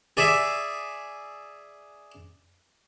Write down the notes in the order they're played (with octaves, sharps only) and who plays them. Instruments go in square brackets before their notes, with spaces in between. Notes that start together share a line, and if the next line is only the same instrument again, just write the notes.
[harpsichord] G#4 D5 E5